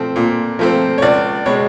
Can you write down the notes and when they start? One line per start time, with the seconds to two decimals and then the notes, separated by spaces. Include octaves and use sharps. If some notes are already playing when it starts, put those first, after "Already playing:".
Already playing: F3 A3 C4
0.16 A#2
0.59 F3 A3 C4
0.98 C#5
1.02 C#2 D5
1.46 B2 G#3 C#5